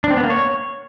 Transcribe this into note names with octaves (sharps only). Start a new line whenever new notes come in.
D4
C4
B3
A#3
C#5